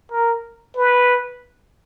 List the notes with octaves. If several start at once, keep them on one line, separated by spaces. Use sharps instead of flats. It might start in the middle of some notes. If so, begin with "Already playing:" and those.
A#4
B4